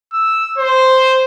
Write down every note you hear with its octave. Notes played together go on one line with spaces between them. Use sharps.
E6
C5